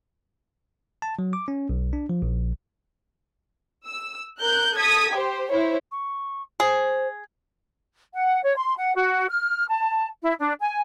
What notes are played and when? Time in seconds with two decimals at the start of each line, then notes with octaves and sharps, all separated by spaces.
1.02 A5
1.19 F#3
1.33 D6
1.48 C#4
1.69 B1
1.93 D4
2.09 F3
2.22 A#1
3.87 E6
4.39 A#4 F#6 G6
4.75 A4 D#6 G#6 B6
5.12 G4 C5
5.49 E4 C5 C#5
5.91 C#6
6.60 G#4 C5
8.13 F#5
8.43 C#5
8.56 C6
8.77 F#5
8.95 F#4
9.29 F6
9.67 A5
10.23 E4
10.38 D4
10.59 G#5